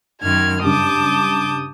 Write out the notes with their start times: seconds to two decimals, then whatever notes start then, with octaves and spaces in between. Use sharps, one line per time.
0.22 F#2 D#3 F6 G#6
0.63 G2 C#3 A5 D6 D#6 G6